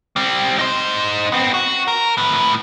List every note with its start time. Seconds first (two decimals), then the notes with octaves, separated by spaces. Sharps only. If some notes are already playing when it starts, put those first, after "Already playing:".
0.16 G3 C4
0.59 D#4 C5
1.32 B3 C4
1.54 F#4
1.88 A#4
2.18 A2 B4